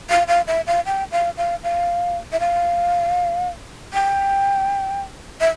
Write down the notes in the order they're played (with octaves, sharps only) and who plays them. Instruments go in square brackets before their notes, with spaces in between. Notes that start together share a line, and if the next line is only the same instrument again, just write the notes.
[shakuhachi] F5
F5
E5
F5
G5
F5
F5
F5
E5
F5
G5
E5